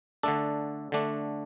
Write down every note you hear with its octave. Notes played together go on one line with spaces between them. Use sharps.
D3 A3 D4 A4
D3 A3 D4